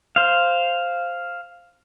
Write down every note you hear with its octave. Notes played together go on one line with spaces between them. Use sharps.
C5 F5